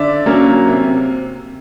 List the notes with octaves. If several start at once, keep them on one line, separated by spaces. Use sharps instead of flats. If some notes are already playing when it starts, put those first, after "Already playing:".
Already playing: D3 D5 E5
F#3 A#3 C#4
C3